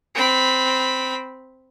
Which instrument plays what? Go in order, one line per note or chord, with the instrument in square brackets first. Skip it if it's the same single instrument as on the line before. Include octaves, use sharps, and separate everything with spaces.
[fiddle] C4 B5